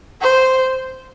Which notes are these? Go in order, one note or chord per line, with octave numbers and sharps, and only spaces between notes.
C5